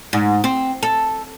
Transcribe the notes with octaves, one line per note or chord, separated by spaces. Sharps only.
G#2
C4
A4